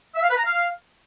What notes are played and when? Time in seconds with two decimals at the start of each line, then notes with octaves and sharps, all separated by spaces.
0.15 E5
0.22 F5
0.29 B4
0.37 A#5
0.44 F5